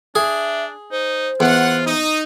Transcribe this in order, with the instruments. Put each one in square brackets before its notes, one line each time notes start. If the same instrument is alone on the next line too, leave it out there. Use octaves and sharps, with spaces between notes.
[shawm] D4 [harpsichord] G#4 [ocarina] E5
[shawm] D#4 [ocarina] C5
[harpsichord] E2 [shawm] F4 [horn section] F#5
[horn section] D#4 [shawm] D#6